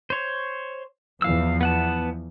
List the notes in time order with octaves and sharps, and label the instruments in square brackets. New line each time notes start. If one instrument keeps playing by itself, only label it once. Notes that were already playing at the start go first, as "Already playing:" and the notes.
[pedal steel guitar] C5 C#5
[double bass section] E2 E3 F3 [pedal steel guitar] F5 E6
[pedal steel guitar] B3 F#5 A5